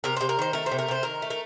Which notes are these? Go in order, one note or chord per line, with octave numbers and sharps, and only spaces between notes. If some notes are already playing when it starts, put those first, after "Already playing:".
C3 A#4
C3 C5
A#4
D#3 C5
A3 A#4
C5
C3
A#4
C3 C5
D#3 A#4
A3
A#4